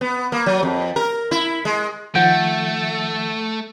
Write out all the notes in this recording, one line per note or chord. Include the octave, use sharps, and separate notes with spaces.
B3
A#3
F#3
F2
A#4
E4
G#3
D#3 F3 A3 F#5 G6 D7